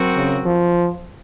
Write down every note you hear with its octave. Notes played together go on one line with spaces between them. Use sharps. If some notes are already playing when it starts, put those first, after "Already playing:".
Already playing: F#3 C4 F#4 A#4
C#3
F3